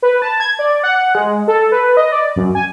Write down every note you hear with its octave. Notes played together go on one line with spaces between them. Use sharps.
B4
A5
G#6
D5
F#5
G#3
A4
B4
D#5
D5
F#2
G#5